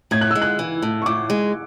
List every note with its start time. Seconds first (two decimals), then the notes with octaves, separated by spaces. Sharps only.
0.11 A2 G#6
0.21 F#6
0.31 G#3 E6
0.42 F#6
0.59 E3
0.82 A2
1.02 C#6
1.06 A2 D6
1.30 G#3